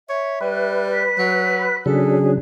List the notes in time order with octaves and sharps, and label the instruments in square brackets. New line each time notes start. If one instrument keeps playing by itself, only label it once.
[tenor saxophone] C#5 [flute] E5
[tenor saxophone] G3 [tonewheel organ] B4
[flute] B6
[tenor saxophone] F#3
[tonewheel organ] C#3 F#3 D4 [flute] G#4 [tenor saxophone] A4